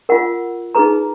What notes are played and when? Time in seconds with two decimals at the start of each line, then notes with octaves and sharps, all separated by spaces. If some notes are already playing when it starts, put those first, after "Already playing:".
0.09 F4 A#4 F#5
0.75 D#4 G#4 B4 A#5